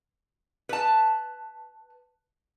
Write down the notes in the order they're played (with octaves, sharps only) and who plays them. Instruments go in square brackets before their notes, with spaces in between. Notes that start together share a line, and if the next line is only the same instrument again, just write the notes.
[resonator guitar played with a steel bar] B4 A5